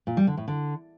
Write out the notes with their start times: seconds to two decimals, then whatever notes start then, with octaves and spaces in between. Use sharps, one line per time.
0.07 A#2
0.17 G3
0.27 D3
0.37 A2
0.48 D3